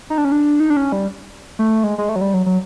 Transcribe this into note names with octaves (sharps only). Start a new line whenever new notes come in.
D#4
D4
C#4
D4
D#4
D4
C#4
G3
A3
G#3
G#3
A3
F#3
G3
F#3
F#3